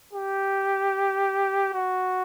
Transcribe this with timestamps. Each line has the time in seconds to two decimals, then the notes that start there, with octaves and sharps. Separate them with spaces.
0.13 G4
1.74 F#4